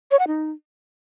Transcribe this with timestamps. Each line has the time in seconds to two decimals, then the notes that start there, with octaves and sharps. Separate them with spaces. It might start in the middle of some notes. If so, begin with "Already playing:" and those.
0.11 C#5
0.19 F#5
0.27 D#4